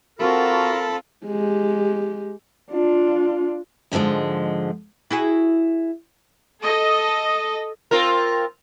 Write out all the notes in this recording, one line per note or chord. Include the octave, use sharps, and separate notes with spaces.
C4 F4 F#4 A4 A#4 A5 B5
G#3 G4
D4 F4
G#2 D3 D#3 F3 G#3
E4 F#4 G#4
A4 D#5
C4 F4 A#4